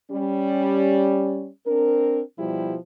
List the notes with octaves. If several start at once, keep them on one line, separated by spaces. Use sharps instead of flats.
G3 C#4
C4 D4 A#4
B2 F3 G3 E4 G4